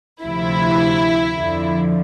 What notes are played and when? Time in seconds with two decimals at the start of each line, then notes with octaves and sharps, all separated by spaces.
0.23 D2 C3 F3 E4
1.35 F2 D3 F3